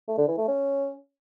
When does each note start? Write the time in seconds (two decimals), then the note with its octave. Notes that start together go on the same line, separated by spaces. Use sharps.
0.08 A3
0.18 D3
0.28 E3
0.38 A3
0.48 C#4